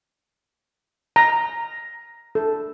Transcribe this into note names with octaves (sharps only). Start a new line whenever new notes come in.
A#5
A4